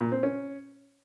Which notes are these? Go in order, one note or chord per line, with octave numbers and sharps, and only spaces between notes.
A#2
C4
C#4